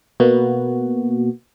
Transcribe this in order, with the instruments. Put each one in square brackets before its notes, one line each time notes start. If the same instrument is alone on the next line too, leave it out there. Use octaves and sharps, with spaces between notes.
[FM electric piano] B2 A#3 B3 F#4